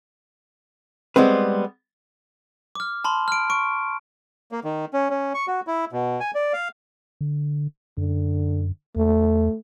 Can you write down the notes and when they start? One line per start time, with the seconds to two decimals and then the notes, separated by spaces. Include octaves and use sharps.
1.16 G3 G#3 B3 C4 B4
2.75 D6 F6
3.04 A5 B5 C6
3.28 F6 D7
3.50 C#6 D7
4.52 A#3
4.64 D#3
4.93 C#4
5.10 C#4
5.34 C#6
5.47 F#4
5.67 E4
5.92 B2
6.20 G#5
6.35 D5
6.53 F5
7.21 D3
7.98 F#2 D3
8.96 E2 A3